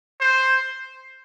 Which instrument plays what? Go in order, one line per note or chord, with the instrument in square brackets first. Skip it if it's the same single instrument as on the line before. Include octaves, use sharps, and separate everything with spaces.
[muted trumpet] C5